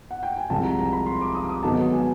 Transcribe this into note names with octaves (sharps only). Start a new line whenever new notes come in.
F#5
G5
G#5
C2 C3 F3 G#3 A5
A#5
A#5
B5
C6
D6
D#6
D6
D#6
G#2 D#3 F#3 B3 D#4 A5
G#5